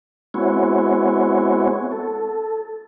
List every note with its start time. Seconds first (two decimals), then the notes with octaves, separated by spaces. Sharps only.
0.34 G#3 B3 C4 E4 F#4 C#5
1.92 A4